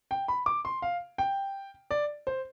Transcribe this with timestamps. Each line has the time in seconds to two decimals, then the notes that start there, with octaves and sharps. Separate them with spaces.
0.11 G5
0.28 B5
0.46 D6
0.65 C6
0.82 F5
1.18 G5
1.91 D5
2.27 C5